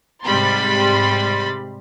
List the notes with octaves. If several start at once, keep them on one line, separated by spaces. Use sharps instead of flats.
G#2 C3 G3 B5 C6 A6